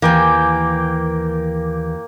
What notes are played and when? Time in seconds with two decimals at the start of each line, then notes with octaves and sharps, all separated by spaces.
0.02 D#2 E3 A#3 G5 G#5